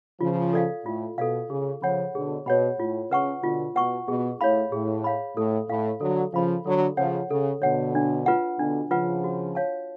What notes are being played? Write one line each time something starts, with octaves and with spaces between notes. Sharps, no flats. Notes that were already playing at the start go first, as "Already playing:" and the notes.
C#3 F3 F4
A4 D5 F5
A2 F4
B2 A4 D5 F5
C#3 G#4
C#3 F3 C#5 F#5 B5
B2 D3 G#4
B2 C#5 F#5 B5
A2 F4
C#3 B4 F#5 C#6
B2 D3 F4
B2 B4 F#5 C#6
B2 G#4
A2 C#5 F5 B5
A2 G#4
C#5 F5 B5
A2 A4
A2 F5 B5
D3 F#3 A4
C#3 F3 F5 B5
D3 F#3 A4
C#3 F3 C#5 F#5
C#3 A4
B2 D3 C#5 F#5
D4
F4 B4 F#5
B2 D3 D4
C#3 F3 F4 B4 F#5
F#4
C#5 F5 A5